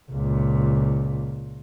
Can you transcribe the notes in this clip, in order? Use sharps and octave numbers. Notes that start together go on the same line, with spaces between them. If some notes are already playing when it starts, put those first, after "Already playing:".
C#2 A#2